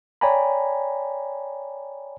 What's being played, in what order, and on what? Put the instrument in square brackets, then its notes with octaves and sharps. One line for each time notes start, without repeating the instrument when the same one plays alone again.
[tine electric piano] C#5 D5 G5 G#5 A#5 B5